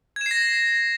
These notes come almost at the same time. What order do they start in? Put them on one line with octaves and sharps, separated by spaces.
G#6 E7 C7 A#6